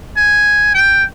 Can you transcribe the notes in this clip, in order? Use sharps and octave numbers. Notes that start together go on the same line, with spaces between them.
G#5
G5